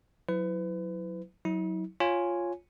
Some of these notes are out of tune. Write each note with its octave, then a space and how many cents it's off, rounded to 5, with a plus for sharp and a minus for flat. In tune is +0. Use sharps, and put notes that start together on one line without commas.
F#3 -15 E4 +0 B4 +35
F#3 +0 E4 -45
F4 +0 C#5 -5 G#5 +0